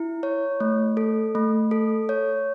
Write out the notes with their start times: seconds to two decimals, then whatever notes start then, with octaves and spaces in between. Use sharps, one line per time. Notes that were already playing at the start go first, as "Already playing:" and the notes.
Already playing: E4
0.23 C#5
0.60 A3
0.97 A4
1.35 A3
1.71 A4
2.09 C#5